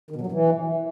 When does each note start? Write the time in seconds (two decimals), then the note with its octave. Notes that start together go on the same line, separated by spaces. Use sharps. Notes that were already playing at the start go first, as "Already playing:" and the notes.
0.11 D#3
0.16 B2
0.21 F#3
0.26 G2
0.32 E3